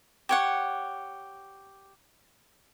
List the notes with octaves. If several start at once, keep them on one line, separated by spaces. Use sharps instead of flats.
G4 C#5 F#5